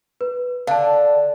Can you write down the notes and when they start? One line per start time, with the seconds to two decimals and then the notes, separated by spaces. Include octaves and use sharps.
0.21 B4
0.67 D3 F5 A5